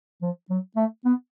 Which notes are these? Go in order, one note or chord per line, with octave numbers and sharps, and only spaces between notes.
F3
F#3
A3
B3